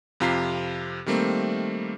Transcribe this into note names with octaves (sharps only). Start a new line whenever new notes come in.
F2 C3 F4 A#5 B6 C7
D#3 G3 A3 A#3 C4